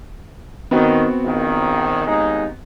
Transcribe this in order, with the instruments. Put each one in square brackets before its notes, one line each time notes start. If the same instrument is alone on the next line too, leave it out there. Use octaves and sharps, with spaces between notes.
[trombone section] D#3 [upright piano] B3 C4 F#4
[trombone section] A#1 D#3
D#2 G#3 D#4